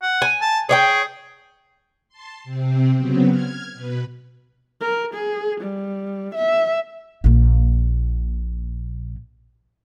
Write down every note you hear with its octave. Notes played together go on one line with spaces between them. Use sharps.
F#5
G#5
A5
G#4 C#5 D5 G5
A5 C6
C3 C4
C#3 F#3 B3 C4
F6 G#6
B2 B4
A#4
G#4
G3
E5
A#1 A#2